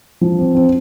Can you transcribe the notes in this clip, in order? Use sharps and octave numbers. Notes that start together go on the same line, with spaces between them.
F3
C4
C4